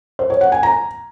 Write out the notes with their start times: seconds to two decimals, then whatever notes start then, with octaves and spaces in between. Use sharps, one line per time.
0.19 C5
0.30 C#5
0.41 F#5
0.52 G#5
0.63 A#5